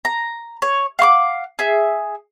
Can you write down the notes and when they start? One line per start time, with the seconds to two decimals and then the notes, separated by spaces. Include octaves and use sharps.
0.05 A#5
0.62 C#5
0.99 F5 F#5 C#6 D6
1.59 G#4 E5